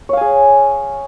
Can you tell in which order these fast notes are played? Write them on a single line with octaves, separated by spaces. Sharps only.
C#5 F5 G#5 G#4